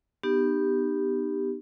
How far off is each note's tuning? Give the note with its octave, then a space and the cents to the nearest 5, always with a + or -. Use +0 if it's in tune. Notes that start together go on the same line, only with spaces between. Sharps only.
B3 +0 D#4 -35 G4 +0